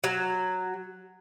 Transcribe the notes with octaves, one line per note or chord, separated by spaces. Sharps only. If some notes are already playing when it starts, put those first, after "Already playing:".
F#3